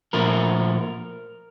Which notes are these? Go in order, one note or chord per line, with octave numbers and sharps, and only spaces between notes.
A#2 F3 A3 A#4